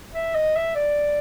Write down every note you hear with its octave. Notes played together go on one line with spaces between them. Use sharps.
E5
D#5
E5
D5